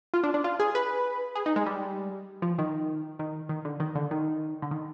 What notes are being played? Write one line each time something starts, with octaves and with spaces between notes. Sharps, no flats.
F4
D4
D4
F4
G#4
B4
G#4
D#4
G#3
G3
F3
D#3
D#3
D#3
D3
D#3
D3
D#3
D3
D#3